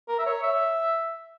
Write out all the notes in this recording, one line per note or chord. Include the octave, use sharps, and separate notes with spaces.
A#4
E5
C#5
E5